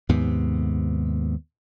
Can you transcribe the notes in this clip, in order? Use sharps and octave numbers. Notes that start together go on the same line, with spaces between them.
D#2 G#2 C3 B3